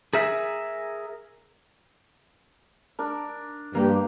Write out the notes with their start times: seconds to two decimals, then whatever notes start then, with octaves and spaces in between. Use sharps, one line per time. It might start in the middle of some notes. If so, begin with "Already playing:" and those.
0.13 G#4 A#4 E5
2.99 D4 A#4
3.75 G2 A#3 G4